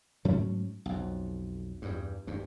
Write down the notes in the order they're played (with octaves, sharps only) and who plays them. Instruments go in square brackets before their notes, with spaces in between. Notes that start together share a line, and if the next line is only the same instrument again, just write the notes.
[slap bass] G#2 F#3 A3 C#4
B1 F2
E2 G2
D2 G2